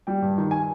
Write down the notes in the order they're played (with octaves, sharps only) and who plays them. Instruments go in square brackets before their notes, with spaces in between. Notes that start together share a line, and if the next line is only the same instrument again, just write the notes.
[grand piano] G3 G5
G2
D#3
G#5